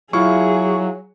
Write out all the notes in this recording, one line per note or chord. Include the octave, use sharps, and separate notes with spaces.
F#3 E4 F4 G#4 F5 C#6